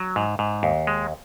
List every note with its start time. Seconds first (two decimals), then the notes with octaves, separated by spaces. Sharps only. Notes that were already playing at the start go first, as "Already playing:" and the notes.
Already playing: F#3
0.16 G#2
0.39 G#2
0.63 D#2
0.87 G#3